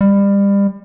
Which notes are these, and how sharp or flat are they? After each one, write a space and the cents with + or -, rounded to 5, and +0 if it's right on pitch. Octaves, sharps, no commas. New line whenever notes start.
G3 +30